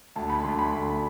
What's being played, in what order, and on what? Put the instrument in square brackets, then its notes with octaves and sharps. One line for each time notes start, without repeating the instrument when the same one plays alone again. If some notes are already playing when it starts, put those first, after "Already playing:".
[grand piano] D2 [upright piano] A5
[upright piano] B5
[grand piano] D2 [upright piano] C6
[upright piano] B5
[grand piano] D2